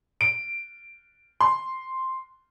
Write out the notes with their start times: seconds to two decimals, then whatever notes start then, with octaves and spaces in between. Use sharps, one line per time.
0.21 D7
1.41 C6